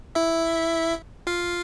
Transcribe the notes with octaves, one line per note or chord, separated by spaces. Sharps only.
E4 E5
F4 F5